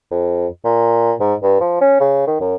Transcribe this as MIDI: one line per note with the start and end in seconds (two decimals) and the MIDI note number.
0.11 0.47 41
0.64 1.13 46
1.20 1.34 44
1.43 1.60 43
1.61 1.77 53
1.81 2.00 61
2.00 2.27 49
2.27 2.39 51
2.41 2.55 42